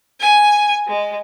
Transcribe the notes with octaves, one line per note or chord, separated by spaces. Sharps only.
G#5
G#3